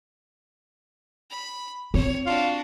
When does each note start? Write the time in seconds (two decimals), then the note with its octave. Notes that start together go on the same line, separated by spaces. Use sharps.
1.30 B5
1.94 C4 C#5
2.26 D4 F4 F#4